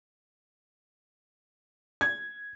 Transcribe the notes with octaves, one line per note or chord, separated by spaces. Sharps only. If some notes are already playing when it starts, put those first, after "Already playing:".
G#6